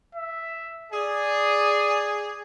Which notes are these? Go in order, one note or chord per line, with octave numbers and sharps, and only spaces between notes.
E5
G#4 D5